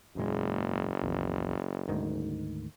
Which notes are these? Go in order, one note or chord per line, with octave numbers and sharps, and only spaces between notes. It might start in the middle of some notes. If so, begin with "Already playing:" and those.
F#1 E2 A#2 G#3
A#1 E2
D2 G#2 D#3